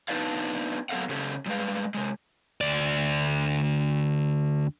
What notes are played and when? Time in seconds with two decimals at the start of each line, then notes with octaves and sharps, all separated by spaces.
0.08 B3 D4 D#4 B4 D5 F5
0.89 F#3 B3 A4 F5 F#5
1.09 C#3 C#4 G4 A4
1.46 A2 G3 G#3 B4 F5
1.94 C3 G#3
2.61 D2 D5